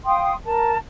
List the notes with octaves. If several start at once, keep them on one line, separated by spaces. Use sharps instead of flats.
F5 G5 C6 D#6
A#4 A5